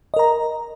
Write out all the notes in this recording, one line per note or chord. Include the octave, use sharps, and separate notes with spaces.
A#4 D#5 A#5